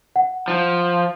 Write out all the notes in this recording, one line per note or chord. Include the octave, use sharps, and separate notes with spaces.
F#5
F3